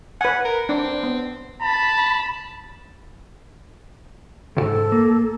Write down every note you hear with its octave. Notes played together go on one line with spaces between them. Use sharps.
B4 F#5 G#5
A#4
C4 D4
B3
A5 B5
D2 G#2 A4
A#3